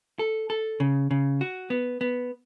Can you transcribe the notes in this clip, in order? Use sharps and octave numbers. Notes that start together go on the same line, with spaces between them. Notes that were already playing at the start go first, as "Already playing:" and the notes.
A4
A4
C#3
C#3
F#4
B3
B3